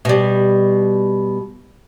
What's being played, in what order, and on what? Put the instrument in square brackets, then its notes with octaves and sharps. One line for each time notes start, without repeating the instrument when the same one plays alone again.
[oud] B2 G3